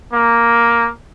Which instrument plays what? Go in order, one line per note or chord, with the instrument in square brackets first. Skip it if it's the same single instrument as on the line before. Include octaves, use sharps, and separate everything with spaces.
[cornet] A#3